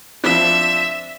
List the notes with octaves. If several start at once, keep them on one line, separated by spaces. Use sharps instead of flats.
F3 C4 D4 E5